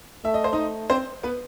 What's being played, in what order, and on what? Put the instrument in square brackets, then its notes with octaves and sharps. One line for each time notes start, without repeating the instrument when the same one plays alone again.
[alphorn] A3 [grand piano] E5
[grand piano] D#5
C5
[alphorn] A3 [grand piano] D#4 D#5
[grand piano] C4 C5
B3 B4